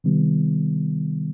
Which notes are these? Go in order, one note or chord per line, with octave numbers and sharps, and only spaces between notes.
C3 D#3 G3 B3